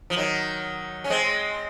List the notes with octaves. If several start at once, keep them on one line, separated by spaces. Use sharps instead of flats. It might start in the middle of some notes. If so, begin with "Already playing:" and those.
F3
D#3 F#3
C#4
G#3 C4